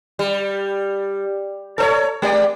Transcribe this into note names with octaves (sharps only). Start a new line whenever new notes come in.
G3
A4 C5 C#5
G#3 G4 D5